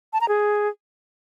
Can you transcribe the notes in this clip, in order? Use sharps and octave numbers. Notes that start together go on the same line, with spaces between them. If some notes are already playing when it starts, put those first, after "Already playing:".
A5
A#5
G#4